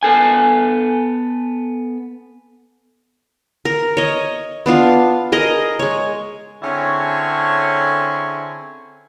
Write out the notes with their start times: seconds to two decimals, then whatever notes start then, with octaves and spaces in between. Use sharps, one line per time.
0.03 B3 A4 G#5
3.65 A#4
3.97 C#5 D#5
4.66 B3 D4 F4 F5
5.32 G#4 A#4 D#5
5.79 G#3 C#5
6.62 D3 C4 C#4 E4 G#4 C#5